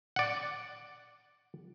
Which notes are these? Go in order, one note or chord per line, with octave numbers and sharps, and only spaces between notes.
D5 F#5